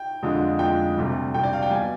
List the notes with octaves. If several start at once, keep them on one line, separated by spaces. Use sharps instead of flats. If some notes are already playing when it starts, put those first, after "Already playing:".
Already playing: G5
F2 D3 G#3 D4 F4
F2 D3 G#3 D4 F4 G5
D2 C3 G3
D2 C3 G3 G5
D5
F5
G5
B2 G3 G#5